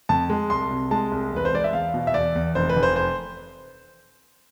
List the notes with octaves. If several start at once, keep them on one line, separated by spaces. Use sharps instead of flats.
F2 A5
G#3
C2 C6
C3
G#3 A5
C2
E2 B4
C5
G#3 D5
E5
E2 F5
B2
E5
E2 D5
E2
F1 C5
B4
F1
C5
C5